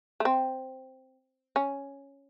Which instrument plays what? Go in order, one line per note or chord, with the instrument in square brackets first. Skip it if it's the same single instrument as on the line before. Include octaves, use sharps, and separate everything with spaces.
[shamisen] A3
C4
C#4